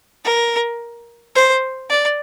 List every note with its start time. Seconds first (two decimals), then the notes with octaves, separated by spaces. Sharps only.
0.24 A#4
1.35 C5
1.89 D5